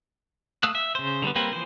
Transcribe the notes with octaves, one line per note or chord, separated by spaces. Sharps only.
A3 F5 D#6 E6 F#6
E5
C#3 C5
D3 G3 A3 B3
G3 A#3 C4 B4
E3 F3 C5